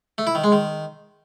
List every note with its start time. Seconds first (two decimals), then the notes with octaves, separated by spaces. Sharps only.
0.18 A3
0.27 E4
0.35 D#3
0.44 G#3
0.52 D#3